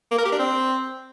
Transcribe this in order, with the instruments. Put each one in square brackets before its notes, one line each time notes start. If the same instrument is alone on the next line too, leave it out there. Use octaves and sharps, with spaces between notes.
[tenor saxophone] A#3
A#4
G4
D4
C4